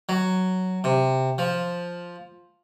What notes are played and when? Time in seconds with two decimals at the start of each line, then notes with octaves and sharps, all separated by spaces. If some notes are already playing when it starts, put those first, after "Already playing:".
0.09 F#3
0.84 C3
1.38 F3